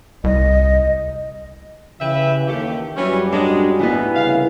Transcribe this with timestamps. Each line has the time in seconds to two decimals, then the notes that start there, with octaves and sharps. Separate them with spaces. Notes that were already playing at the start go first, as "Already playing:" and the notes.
0.24 C2 D#5
2.00 C#3 E3 G4 B4 E5
2.47 D#2 A3 G4
2.97 F#2 E3 F#3 G3 C#4
3.32 G#3 D4 D#5
3.79 D#2 E3 B3 D#4
4.15 C2 C#3 F5